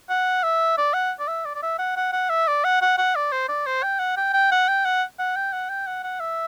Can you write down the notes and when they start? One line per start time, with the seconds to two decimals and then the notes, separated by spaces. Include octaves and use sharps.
0.10 F#5
0.43 E5
0.78 D5
0.94 F#5
1.19 D5
1.27 E5
1.45 D5
1.55 D5
1.63 E5
1.78 F#5
1.96 F#5
2.12 F#5
2.29 E5
2.47 D5
2.64 F#5
2.81 F#5
2.97 F#5
3.15 D5
3.32 C5
3.49 D5
3.66 C5
3.83 G5
3.99 F#5
4.17 G5
4.33 G5
4.51 F#5
4.68 G5
4.85 F#5
5.19 F#5
5.36 G5
5.53 F#5
5.69 G5
5.87 F#5
6.04 F#5
6.20 E5